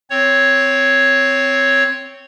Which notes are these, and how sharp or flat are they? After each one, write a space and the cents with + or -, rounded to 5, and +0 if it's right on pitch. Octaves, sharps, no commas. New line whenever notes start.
C4 +0 C#5 +0